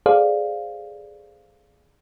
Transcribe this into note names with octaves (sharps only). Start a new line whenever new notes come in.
G#4 A4 C5 D5 F5